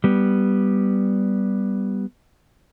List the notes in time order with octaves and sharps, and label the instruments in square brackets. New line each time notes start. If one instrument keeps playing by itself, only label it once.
[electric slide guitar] G3 B3